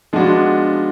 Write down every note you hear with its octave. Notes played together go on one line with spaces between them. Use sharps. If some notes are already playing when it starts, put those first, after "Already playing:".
F3 G#3 B3 D4 F#4